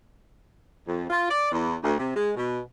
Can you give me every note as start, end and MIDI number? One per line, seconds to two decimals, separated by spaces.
0.87 1.05 41
1.10 1.26 65
1.30 1.49 74
1.52 1.75 40
1.83 1.94 38
1.98 2.11 48
2.16 2.30 56
2.36 2.60 47